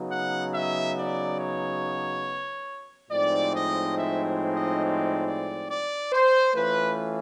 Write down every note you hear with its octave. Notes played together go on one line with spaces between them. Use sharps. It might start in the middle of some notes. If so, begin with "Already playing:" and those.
Already playing: C#3 F#3 B3 D#4
F#5
E5
D5
C#5
A2 F3 G#3 C4 D#4 D5
D#5
E5
D#5
D5
D5
D5
C5
E3 A3 C#4 F4 B4